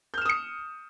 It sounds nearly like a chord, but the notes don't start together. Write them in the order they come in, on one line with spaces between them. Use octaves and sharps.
G6 F6 E7 D#6 C#7